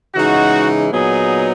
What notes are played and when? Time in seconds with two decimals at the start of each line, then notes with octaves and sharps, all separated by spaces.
0.15 C#3 E3 G#3 D#4 F#4
0.91 A#2 F#3 B3 D#4 G#4